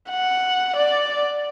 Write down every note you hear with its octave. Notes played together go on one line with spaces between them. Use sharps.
F#5
D5